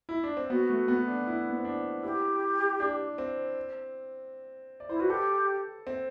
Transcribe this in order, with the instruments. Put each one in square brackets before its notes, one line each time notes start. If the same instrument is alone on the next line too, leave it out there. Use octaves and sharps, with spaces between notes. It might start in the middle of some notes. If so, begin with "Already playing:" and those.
[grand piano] E4
D4
C4
[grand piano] B3 [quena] F#4
[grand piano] A3
B3
D4
E4
B3
C4
D4
[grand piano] E4 [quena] G4
[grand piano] D4
C4
D5
[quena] E4 [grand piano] C5
[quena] F#4 [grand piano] B4
[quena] G4 [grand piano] A4
[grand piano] C4